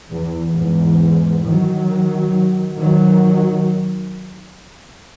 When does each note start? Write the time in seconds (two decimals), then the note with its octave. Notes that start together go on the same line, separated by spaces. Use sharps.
0.10 E2
0.55 E2 G#2
1.45 D#3 F#3
2.80 D#3 F#3